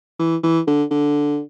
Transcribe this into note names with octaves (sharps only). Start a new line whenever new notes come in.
E3
E3
D3
D3